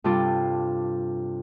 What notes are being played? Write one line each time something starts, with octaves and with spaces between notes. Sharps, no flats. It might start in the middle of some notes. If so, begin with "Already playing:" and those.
G2 C3 F4 A4 D6